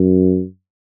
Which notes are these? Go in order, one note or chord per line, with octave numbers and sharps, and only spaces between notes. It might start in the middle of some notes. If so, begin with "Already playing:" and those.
Already playing: F#2